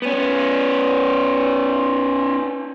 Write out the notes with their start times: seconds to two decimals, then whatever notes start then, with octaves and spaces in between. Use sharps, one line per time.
0.02 B3 C#4